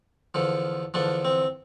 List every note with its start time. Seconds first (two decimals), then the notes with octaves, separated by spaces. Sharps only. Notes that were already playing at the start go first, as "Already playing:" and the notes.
0.34 E2 D3 F3
0.94 E2 D3 F3 D4
1.25 C4